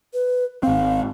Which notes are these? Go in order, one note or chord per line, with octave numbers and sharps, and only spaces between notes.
B4
G#1 C4 F5